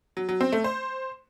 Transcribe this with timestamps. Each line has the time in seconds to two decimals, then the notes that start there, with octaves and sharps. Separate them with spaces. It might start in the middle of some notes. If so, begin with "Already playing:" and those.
0.17 F#3
0.29 F#3
0.41 C4
0.52 A3
0.64 C5